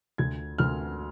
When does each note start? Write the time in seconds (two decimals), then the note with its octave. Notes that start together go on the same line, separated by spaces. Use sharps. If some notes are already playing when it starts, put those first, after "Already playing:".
0.18 D2 G#6
0.58 D2 F6